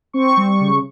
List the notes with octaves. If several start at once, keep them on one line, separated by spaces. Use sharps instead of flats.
C4 C#6
G3
C#3